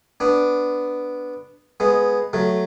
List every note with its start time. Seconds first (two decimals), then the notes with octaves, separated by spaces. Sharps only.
0.20 B3 D4
1.80 G#3 B3
2.33 F#3 A3